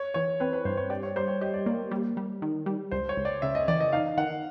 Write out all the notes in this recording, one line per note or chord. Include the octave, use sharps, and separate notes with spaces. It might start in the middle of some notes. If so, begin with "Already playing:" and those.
Already playing: C#5
E3 C#5
C4 B4
B4
G2 C5
C#5
G4 D5
C#5
G3 C5
C#5
G4 D#5
D5
A#3 D5
G3
G3
D#3
G3
C#2 C5
C#5
C#2
D5
C#3 E5
D#5
E3 D5
D#5
D#4 F5
D#3 F#5